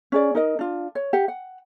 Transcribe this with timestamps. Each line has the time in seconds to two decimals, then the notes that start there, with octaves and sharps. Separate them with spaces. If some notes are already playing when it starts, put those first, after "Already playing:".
0.12 C#4 G#4 D5
0.35 D#4 A#4 D#5
0.59 D4 F4
0.95 C#5
1.13 G4 F#5
1.28 F#5